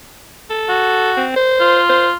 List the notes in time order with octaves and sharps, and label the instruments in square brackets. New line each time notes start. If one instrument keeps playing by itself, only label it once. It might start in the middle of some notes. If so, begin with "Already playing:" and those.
[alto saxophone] A4
[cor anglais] F#4
[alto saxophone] C4
C5
[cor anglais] F4
[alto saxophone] C5